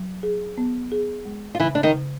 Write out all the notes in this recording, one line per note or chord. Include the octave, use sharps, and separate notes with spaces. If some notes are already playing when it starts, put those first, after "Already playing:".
Already playing: F#3
G#4
B3
G#4
G#3
F4
C#3 E3 E4
D4
D#3 D#4
C#3